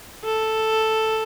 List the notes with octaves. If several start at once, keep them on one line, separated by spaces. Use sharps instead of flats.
A4